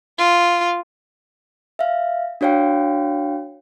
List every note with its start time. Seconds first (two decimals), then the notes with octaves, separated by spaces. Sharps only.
0.18 F4
1.79 E5 F5
2.41 D4 F#4 C#5 F5 G5